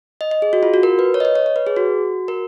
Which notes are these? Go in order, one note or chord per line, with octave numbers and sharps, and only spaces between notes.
D#5
D#5
G#4
F#4
F4
F#4
A#4
B4
C#5
D#5
C#5
C#5
C#5
B4
G#4
F#4
A#4